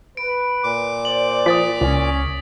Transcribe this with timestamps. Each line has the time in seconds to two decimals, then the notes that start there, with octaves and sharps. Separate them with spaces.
0.17 B4 D7
0.64 A#2 D6
1.05 C5 D5 F#7
1.46 F3 D#6 A6 B6
1.81 C#2 C#4